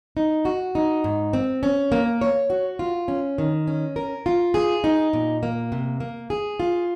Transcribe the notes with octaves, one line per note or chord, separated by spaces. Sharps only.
D#4
F#4
D#4
G#2
C4
C#4
A#3
C#5
F#4
F4
C#4
D#3
C#4
A#4
F4
G#4
D#4
A#2
A#3
C3
A#3
G#4
F4